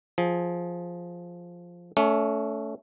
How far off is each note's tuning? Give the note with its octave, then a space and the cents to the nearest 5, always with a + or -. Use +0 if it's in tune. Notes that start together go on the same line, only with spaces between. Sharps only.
F3 +0 G#4 +5
A3 +0 C#4 +25